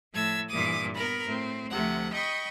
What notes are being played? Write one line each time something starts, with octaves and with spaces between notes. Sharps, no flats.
A2 F3 A5 E6 G#6
G2 A#2 E3 D6 D#6
B3 A#4 A#5 B5
A2 C4
D2 C3 F3 A3 F#5
D#5 G5 B5 C#6 D#6